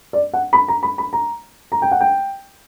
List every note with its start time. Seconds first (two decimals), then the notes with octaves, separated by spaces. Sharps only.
0.13 D5
0.33 F#5
0.53 B5
0.68 A#5
0.83 B5
0.98 B5
1.13 A#5
1.72 A#5
1.82 G5
1.91 F#5
2.01 G5